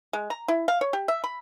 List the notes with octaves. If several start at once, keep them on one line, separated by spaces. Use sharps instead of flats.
G#3
A#5
E4
F5
C#5
G4
E5
B5